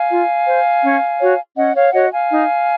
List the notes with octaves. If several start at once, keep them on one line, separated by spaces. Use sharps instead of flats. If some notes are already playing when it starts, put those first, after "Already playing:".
Already playing: F5 G#5
F4
C5
C#4
F#4 C#5
C#4 D#5 F#5
C#5 F5
F#4 C#5 D#5 F#5
F5 G#5
D#4